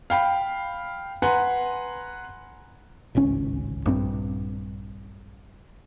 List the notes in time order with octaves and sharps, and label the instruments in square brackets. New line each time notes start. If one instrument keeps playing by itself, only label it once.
[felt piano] F5 G5 B5
B4 F#5 G#5 A#5 C6
[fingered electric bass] D1 G#1 C#2 C#4
A#1 G2 C4